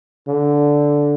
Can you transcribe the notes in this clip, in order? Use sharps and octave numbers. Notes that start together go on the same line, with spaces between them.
D3